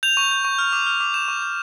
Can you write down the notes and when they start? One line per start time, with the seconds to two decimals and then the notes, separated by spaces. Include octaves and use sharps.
0.03 G6 F7
0.17 C#6
0.31 G6
0.45 C#6
0.58 F6
0.73 D6
0.86 F6
1.00 D6
1.14 G6 E7
1.28 C#6
1.42 G6